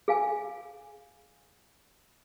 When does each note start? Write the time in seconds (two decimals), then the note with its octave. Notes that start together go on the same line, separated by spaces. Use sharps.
0.08 G#4 F5 G#5